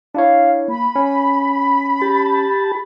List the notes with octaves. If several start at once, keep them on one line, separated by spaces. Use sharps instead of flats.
D4 E4 C#5 F5
A#3 B5
C#4
G4 A5